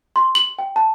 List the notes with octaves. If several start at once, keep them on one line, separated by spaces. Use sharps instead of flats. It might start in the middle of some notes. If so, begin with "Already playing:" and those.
C6
F#7
G5
A5